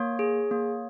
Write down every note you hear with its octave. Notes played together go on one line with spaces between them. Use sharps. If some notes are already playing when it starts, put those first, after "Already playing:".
Already playing: A#3 C#5
G#4
A#3